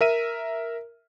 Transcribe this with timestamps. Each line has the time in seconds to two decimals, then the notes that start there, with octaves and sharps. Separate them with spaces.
0.01 A#4 E5 D#7